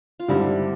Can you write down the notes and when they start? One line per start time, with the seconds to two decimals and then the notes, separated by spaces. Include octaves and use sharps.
0.20 F4
0.28 G2 D3 G3 C4 E4